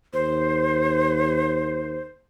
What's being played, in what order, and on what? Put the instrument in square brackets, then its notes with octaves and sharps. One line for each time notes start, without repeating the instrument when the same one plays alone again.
[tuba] D#2 [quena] C5